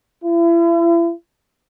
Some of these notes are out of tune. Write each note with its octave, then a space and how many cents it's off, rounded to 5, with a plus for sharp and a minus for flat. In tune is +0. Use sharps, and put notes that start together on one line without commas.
E4 +40